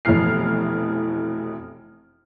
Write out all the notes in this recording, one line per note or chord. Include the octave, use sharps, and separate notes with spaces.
F1 B2 E3 F6 C7